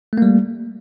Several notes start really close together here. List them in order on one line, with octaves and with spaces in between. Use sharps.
A3 A#3 G3